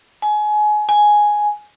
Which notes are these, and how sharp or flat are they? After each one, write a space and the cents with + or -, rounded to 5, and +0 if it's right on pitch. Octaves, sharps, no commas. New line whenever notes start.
G#5 +25
G#5 +5